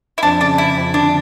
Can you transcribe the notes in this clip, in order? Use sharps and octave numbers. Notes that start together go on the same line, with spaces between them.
E4
F2 D4
C#3 D4
C#3 E4
F2
D3 D4